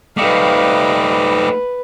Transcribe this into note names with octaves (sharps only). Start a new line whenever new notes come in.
G3 A3 D#4 B4 D#5 F5 D6
B4